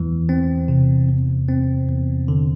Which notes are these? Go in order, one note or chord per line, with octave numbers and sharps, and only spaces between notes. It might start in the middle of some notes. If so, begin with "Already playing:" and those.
Already playing: E2 E3
C4
C3
E2
C4
E2
D3